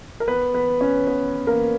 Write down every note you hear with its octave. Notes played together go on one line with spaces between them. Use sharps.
A#4
B3 B4
B3 B4
C#4 C#5
B3 B4
A#3 A#4